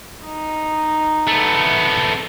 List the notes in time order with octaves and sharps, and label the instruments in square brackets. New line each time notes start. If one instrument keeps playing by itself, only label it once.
[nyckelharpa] D#4
[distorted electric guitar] A3 B3